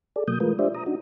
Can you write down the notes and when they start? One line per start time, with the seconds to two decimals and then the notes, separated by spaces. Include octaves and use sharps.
0.16 G#4 A4 D5
0.28 B2 F#3 A#3 D#6 G6
0.40 E3 G#3 A3 F4 A#4 B4
0.59 D4 F4 G4 C5 D5 E5
0.74 A#5 D#6
0.86 D4 D#4 F#4